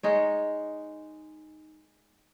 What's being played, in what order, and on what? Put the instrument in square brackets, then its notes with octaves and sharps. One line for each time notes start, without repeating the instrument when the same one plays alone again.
[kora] G#3 D#4 C#5